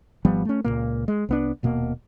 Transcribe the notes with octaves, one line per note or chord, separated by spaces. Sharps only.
G#1 F3 G3 B3
A3 C#4
C#2 G2 A#2 A#3
G#3
C2 B3 D4
D#1 B2 A#3